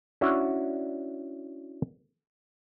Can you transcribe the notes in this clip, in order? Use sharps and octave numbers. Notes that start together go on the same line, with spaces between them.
C#4 D4 E4 F#4